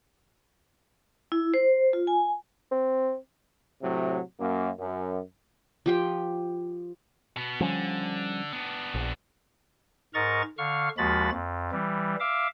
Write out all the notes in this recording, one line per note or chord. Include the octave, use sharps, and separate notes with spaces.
E4
C5
F4
G#5
C4
A2 C3 F#3
F#2 A#3
F#2
F3 G4 G5
B2 B3
D3 F3 G3 C#4
B3 D4
A#1
G#2 A#4 D#5 A#5 C#6 A6
D3 F5 C#6 F6
D#2 F3 G#3 F#4 B5 A6
F2
E3 G3
E5 F5 D6